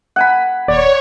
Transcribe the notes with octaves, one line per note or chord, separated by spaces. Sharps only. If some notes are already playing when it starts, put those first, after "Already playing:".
F#5 G#5 B5
D#1 C#5 D5